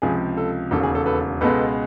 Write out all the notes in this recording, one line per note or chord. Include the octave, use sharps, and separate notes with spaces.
C#2 C3 F3 G#4
A4
E1 D#2 C#3 A4
G#4
A4
A4 B4
C#2 B2 G#3 A4 B4